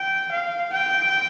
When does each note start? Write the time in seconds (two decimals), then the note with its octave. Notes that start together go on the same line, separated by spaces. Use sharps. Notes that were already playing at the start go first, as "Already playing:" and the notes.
Already playing: G5
0.32 F5
0.73 G5